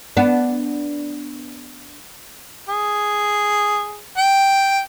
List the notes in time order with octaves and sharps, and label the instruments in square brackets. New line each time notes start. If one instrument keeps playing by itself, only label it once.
[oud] B3 D4
[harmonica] G#4
G5